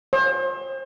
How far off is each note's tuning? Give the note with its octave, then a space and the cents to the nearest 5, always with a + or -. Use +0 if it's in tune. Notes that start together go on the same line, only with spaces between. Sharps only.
C5 +35